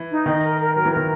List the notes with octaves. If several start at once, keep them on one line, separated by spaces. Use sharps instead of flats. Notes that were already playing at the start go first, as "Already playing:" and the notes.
Already playing: E3
D#4
D#3 D#5
A#4
A#4
F#3 A#4
E3
D#3 A#4